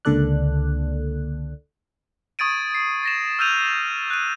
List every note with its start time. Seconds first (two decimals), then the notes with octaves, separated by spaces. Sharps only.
0.05 C#2 D3 A#3 A4 D5 F#6
2.39 C#6 D#6 G#6 A6 D7 D#7
2.74 C7
3.03 A6 A#6 E7
3.39 E6 F6 G6 D#7 F7
4.10 F#6 D#7